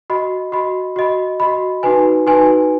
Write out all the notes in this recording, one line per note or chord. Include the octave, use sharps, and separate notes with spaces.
F#4 D#5 B5
F#4 D#5 B5
F#4 D#5 B5
F#4 D#5 B5
D#4 F#4 B4 G#5
D#4 F#4 B4 G#5